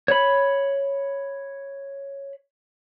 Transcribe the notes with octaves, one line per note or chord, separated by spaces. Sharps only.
C#5 B5